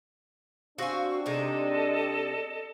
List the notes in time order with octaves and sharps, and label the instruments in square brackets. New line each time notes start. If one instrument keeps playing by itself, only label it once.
[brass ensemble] C4 D4 [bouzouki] F#4 F5 G#5 [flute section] C5 C#6 E6
[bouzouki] C3 G#3 D#4 [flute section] A4 D5 D#5